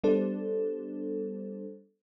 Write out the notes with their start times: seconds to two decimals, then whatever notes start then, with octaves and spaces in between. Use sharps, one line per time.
0.04 G3 B3 D4 A4 C5